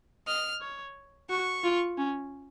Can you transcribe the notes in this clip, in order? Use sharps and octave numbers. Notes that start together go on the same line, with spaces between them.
D#5 F6
C#5
F#4 C#6
F4
C#4